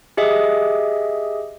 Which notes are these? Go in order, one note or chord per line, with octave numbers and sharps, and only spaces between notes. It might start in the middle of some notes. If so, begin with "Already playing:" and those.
G4 G#4 D#5 E5